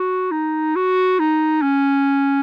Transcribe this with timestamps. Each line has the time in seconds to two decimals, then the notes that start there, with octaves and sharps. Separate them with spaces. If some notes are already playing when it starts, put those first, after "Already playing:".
Already playing: F#4
0.31 D#4
0.76 F#4
1.19 D#4
1.62 C#4